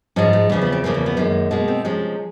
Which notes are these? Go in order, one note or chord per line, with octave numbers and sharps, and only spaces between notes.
G#2 F3 G#3 C#4
A3
E2 C#3 F3
B3
C4
E2 C#3 F3 A3 A#3
A#3
B3
F#2 D#3 G#3 A#3
B2 G#3 A#3
C4
C3 F3 G#3 C#4